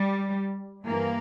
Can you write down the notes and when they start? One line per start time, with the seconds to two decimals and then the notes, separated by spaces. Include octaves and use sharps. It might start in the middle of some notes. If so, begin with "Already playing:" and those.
Already playing: G3
0.86 G2 E3 A#3